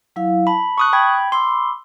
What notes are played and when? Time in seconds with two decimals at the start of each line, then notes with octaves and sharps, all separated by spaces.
0.16 F#3 E4 F5
0.47 A5 B5
0.78 C#6 D#6 F#6
0.93 G5 B5 G#6
1.32 B5 C6 D6 E6